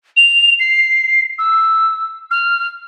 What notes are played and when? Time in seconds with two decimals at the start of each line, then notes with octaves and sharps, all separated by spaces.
0.16 F7
0.60 C7
1.38 E6
2.31 F6